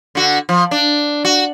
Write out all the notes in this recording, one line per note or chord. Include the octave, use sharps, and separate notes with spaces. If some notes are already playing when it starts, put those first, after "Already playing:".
D3 F#4
F3
D4
F#4